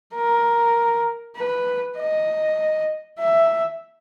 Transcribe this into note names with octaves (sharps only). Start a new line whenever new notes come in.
A#4
B4
D#5
E5